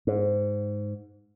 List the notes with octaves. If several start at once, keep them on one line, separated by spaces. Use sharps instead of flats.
G#2